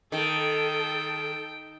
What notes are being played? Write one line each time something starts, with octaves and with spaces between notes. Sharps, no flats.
D#3 A4 G5